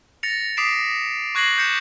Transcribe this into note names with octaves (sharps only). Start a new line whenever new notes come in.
A6 A#6 C#7 F7
D6 D#6 B6 C7 D7 E7
C#6 F#6 G#6 A#6 C7 F#7
G6 A#6 B6 C#7 E7